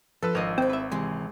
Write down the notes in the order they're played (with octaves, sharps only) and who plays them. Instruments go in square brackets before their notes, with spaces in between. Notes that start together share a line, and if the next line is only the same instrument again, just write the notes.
[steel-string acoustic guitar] F3 D4 [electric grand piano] A4 B4 E6
[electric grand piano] G#1 [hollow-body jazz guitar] A#4 D#5 F5
[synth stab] C4 [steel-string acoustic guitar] E4 A4
[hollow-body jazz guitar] B4 E5
[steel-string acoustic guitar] C3 E3 [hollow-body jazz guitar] G#3